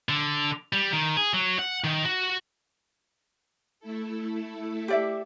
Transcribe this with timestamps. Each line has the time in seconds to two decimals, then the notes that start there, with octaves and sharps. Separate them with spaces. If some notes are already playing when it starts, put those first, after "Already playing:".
0.09 D3
0.73 G3
0.93 D#3
1.17 G#4
1.34 F#3
1.59 F#5
1.84 D#3
2.05 F#4
3.80 A3 E4 A4
4.88 G4 D5 E5